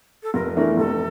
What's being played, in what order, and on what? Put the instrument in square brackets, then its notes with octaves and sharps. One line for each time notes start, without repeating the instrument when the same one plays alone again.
[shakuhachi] A4
[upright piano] F1 [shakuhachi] A#4
[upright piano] E2 E3 A3 D4 [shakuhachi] A#4
[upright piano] F1 [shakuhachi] A4